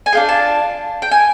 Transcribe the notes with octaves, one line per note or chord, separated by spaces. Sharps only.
G#5
D4 F4 G#4 G5
A5
G5
G#5